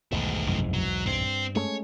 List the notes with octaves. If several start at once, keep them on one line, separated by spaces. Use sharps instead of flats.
B1 E2 G#2 D#3 A3
F1 F#2 E3
F#3
G2 C4 C5
G#3 A3 C#4 C#5